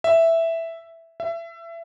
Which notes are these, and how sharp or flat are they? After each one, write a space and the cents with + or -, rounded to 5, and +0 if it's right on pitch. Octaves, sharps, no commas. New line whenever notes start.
E5 +0
E5 +25